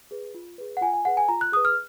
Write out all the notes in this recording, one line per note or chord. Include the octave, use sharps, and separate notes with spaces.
G#4 B4
F4
G#4 B4
F#5
F4 G#5
G#5
G#4 B4 F#5
G#5
F4 A#5
F#6
G#4 B4 D#6
F6